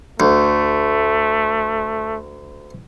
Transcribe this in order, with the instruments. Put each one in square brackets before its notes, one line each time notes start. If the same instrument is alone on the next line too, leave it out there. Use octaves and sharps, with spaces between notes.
[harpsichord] D2 [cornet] A3